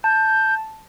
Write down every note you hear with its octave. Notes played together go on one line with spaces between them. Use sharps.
A5 G6